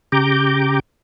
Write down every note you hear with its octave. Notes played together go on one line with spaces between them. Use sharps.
C#3 G4 A#5 D6 G6